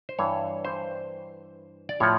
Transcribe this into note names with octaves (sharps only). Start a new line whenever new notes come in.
C5
G2 E3 C#5
C5
D5
A2 F3 C#5